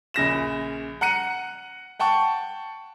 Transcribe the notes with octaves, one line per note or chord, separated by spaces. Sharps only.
A#1 C#3 A#6 E7
F#5 A#5 F#6 C#7 D#7
F#5 G5 A5 C#6